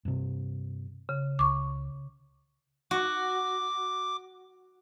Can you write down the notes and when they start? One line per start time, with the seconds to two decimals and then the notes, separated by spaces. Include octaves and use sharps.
0.05 G2 C3
1.09 C#3
1.39 C#2 C#6 D6
2.91 F#4 D6